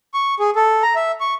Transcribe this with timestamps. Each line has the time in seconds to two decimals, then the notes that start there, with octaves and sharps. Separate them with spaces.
0.14 C#6
0.40 G#4
0.56 A4
0.83 A#5
0.95 E5
1.20 C#6